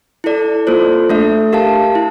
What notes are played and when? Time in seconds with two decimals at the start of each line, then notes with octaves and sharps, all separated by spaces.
0.24 E4 A4 D5
0.67 A#3 F4 A4 C5
1.09 A3 D4 A4 E5
1.53 G4 A#4 F5 A5
1.95 E4